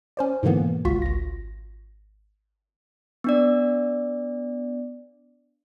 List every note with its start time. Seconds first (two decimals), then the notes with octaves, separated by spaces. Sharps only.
0.17 C#4 C5 D5
0.43 G#2 B2 D3 E3 A#3 B3
0.85 G1 C#2 F4 F#4 B6
1.02 G#1 A#6
3.24 B3 D4 D5